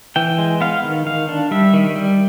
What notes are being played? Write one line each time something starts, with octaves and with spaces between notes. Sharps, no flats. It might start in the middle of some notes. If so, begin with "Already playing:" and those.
E3 G5
G#3
B3 F5
D#3
D#3 F5
D4
G3 E5
D#3
G3